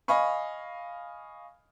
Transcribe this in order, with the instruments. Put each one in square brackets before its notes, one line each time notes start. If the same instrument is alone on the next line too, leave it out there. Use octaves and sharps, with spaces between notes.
[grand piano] D#5 F5 G#5 B5 C#6